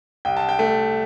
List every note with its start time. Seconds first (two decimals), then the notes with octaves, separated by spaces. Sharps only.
0.25 C2 G5
0.37 A5
0.49 G5
0.59 A3